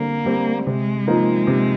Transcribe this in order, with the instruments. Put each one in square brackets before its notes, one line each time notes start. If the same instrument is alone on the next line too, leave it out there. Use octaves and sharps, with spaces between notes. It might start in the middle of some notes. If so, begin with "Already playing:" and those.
Already playing: [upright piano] D3 G3 C4 [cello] A#3
[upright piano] G3 C4
[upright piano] C3 [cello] G#3
[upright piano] F3 A#3 D#4
C3